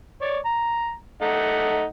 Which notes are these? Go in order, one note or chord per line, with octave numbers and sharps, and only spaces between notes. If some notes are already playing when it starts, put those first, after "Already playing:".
C#5 D5
A#5
A3 D#4 F#5